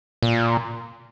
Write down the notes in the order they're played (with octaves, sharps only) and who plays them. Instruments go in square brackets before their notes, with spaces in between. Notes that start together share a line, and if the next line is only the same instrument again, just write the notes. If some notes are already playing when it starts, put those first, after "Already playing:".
[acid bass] A#2